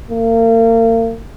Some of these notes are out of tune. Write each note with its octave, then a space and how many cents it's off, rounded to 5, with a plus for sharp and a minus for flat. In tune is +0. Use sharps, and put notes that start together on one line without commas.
A#3 -40